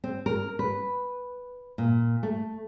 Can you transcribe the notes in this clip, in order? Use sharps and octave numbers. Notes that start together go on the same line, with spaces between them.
C4
A#4
B4
A#2
A3